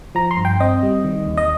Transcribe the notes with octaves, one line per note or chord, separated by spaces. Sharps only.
F3 A#5
C6
G2
G5
C4 D#5
G3
D#3
D#2
D#5